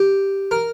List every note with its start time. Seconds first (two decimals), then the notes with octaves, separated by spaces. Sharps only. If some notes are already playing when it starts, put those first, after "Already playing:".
Already playing: G4
0.51 A#4